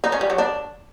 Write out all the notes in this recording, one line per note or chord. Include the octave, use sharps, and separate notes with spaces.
D#4
C#4
G3
F#3
D4